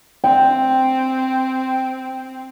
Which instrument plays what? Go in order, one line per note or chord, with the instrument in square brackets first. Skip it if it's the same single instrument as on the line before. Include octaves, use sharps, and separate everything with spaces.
[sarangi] C4 [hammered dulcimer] G5